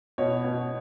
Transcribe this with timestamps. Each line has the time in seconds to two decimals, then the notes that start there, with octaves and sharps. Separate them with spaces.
0.18 B2 C#5
0.44 B2